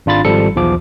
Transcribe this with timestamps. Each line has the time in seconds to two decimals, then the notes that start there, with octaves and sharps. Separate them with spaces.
0.06 G#1 D4 F4 B5 A6
0.25 G#1 F3 G3 A4 C#7
0.55 B1 E2 F3 D6